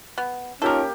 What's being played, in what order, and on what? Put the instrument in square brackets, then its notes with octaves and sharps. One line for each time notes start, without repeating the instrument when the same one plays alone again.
[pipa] B3
[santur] A#3 G4 [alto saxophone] C#4 [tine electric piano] D#4 F4 [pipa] A4 A#4